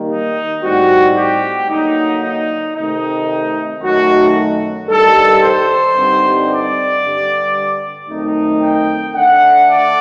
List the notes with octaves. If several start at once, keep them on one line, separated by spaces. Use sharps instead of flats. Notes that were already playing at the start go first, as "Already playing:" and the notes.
Already playing: D#3 G3 A#3
D#4
A2 G3 C4 D#4 F#4
G4
D3 F#3 A#3 D#4
D#4
C3 D#3 A3 C4 D#4
F#2 D#3 A3 D#4 F#4
G2 D#3 G3 A4
C5
G2 D3 G3 C4 D#4
D5
G2 D3 G3
F#2 D#3 A3 C4 D#4
G5
D3 A3 D4 F#5
D5